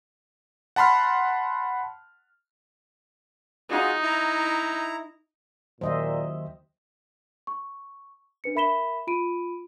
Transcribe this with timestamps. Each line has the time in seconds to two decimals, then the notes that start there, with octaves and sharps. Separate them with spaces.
0.76 F#5 A5 B5 C6 F6
3.71 D#4 F4 F#4 G#4
4.03 E4 A#5
5.81 D#2 A#2 F#3 C5 D#5 E5
7.47 C#6
8.44 D4 B4 C#7
8.55 A#4 E5 B5 B6 E7 G7
9.07 F4 B5 D7 D#7